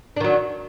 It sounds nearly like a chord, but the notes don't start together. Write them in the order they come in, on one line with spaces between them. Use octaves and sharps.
D4 D#3 F#3